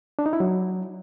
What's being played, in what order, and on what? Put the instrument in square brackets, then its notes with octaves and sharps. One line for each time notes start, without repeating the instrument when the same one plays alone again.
[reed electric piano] D4
D#4
E4
F#3